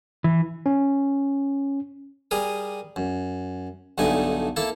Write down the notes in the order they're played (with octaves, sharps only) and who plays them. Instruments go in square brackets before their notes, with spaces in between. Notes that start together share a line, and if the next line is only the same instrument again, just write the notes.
[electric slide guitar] E3
[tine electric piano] C#4
[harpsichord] G3 G#4 A#4 D#6
F#2
B1 G2 D3 A3 D#4 G#5
A#3 E4 A4 A5